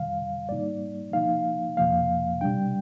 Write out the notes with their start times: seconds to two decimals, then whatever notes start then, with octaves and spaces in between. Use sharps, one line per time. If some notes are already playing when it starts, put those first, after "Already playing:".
Already playing: F2 C3 D#3 G3 F5
0.49 G#2 G3 A#3 D#4 D5
1.13 C3 F3 A#3 D#4 F5
1.77 F2 C3 F3 A#3 F5
2.41 C3 G3 D4 G5